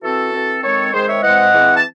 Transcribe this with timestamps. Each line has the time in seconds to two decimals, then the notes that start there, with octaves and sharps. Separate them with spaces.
0.03 E3 C4 F#4 A4
0.33 E3 C4
0.62 D#3 G#3 C4 A4 C#5
0.93 D#3 G#3 C4 G#4 C5
1.08 C#5 E5
1.23 E3 G#3 C4 D#5 F#5
1.53 E3 G#3 C4
1.75 A5